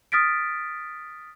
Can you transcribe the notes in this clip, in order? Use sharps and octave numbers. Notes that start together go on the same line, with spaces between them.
D#6 F6 A6 B6 D7